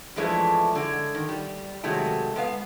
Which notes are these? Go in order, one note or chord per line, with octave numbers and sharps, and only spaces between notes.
F2 E3 F3 G#3 A3 D4
D3 G#3
D#3
G3
C3 D#3 F#3 G#3 A3
G#3 B3 F5